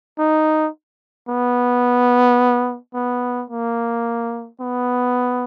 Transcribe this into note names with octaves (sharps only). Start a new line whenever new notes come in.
D#4
B3
B3
A#3
B3